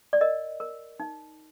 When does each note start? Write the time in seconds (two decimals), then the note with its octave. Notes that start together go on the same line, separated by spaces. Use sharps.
0.13 D5
0.21 A#4 D#5
0.60 A#4
1.00 D#4